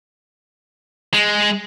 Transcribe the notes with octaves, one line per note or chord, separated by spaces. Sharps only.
G#3